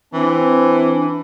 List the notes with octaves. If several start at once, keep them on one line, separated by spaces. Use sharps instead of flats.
E3 C4 D4